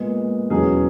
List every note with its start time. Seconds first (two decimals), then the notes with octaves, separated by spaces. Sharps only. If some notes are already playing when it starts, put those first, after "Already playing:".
Already playing: A#2 G#3 B3
0.50 E2 B2 F#3 C#4 G#4